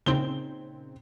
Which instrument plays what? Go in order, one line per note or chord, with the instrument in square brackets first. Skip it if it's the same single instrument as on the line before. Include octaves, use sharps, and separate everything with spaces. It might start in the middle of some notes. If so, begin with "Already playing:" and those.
[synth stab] A#2 C#3 C4 [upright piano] D#4 G7